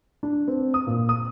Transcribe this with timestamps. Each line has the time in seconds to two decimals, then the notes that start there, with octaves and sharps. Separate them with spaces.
0.23 D4
0.48 C4
0.74 D#6
0.87 A#2
1.09 D#6